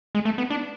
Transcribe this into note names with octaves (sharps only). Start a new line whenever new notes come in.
G#3
A3
B3
D4